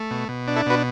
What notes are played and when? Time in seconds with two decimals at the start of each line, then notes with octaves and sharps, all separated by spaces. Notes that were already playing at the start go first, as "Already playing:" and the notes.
Already playing: A3
0.11 B2
0.29 B2
0.47 D4
0.56 E4 A4
0.66 B2 F#4 B4